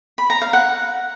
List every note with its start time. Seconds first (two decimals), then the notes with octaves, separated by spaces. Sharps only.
0.18 B5
0.30 A#5
0.42 F5
0.53 F#5